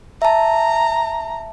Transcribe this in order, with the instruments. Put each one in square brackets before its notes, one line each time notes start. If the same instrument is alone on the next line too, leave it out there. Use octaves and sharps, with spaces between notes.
[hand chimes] E5 A5 [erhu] A#5